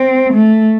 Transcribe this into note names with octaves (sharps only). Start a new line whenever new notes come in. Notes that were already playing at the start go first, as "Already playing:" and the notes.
Already playing: C4
A3